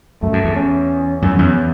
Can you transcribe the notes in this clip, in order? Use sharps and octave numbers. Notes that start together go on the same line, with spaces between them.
F#2 A3
F#2
E2
C#4
F#2 C#4
E2